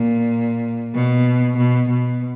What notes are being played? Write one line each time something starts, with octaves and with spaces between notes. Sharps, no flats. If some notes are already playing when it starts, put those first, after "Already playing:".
Already playing: A#2
B2
B2
B2